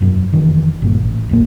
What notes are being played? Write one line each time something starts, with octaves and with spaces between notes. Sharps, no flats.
E1 F#2
F1 D#3 E3
G#1 G2 A#2
A1
E1 A#1 A#3